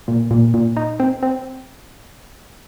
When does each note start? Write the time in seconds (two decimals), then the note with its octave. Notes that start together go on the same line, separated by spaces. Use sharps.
0.08 A#2
0.31 A#2
0.54 A#2
0.76 D#4
1.00 C4
1.23 C4